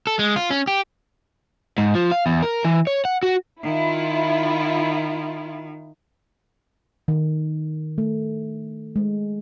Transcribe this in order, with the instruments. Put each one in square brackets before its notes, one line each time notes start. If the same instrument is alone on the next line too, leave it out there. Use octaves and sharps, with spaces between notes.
[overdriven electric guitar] A4
G#3
F4
C#4
G4
G#2
F3
F5
E2
A#4
E3
C#5
F#5
F#4
[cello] D#3 [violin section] E4 F4
[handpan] D#3
A3
G#3